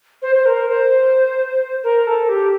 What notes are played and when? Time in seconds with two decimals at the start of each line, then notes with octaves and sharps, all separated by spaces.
0.22 C5
0.36 C5
0.46 A#4
0.69 C5
1.84 A#4
2.07 A4
2.29 G4